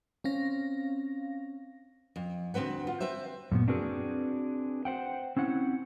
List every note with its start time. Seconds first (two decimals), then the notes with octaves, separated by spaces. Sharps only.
0.24 C4 C#4 F5 A#6
2.16 F2
2.54 D2 F3 C4 B4 F#5
2.87 F4
3.00 C4 B4 C5 E5
3.52 F#2 A#2 B3
3.68 C4 D4 F#4 G#4 A#4 B4
4.85 C5 F#5 G5
5.37 C4 C#4 E4 F#5